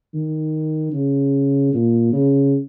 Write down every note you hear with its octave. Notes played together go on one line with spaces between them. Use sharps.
D#3
C#3
A#2
C#3